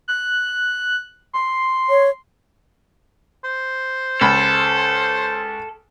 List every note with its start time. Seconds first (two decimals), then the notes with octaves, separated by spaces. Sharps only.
0.08 F#6
1.33 C6
1.90 C#5
3.44 C5
4.21 C#2 A4 B5